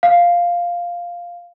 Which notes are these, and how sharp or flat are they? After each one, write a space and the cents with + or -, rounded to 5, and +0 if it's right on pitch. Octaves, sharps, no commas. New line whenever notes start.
F5 +0